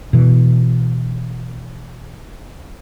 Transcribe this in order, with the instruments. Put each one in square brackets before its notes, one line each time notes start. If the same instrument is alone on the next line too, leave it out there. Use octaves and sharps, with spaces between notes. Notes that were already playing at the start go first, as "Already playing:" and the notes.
[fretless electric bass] B2 E3